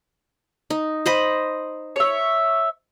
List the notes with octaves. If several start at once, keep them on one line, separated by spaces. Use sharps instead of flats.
D#4
C5 D#5 B5
C#5 E5